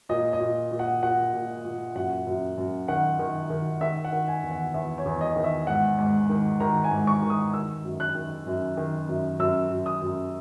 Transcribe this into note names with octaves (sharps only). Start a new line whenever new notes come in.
A#2 D#5
D#5
A#2
A#2
F#5
A#2 F#5
A#2
A#2
F#2 F#5
F#2
F#2
D#3 F#5
D#3
D#3
D#3 E5
F#5
D#3
G#5
E2
F#5
E2 E5
C#5
E2
D#5
D#3
E5
G#2 F#5
G#2
D#3
D#3 A#5
G#5
G#2
C#6
D#3
D#6
D#3 E6
F#2
F#6
D#3
F#2
D#3
F#2
F#2 E6
F#2
D#6
F#2